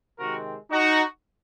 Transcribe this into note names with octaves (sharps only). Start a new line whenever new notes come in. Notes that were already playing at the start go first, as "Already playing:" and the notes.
C3 D#3 G#3 C4 F#4 A#4
D#4 F#4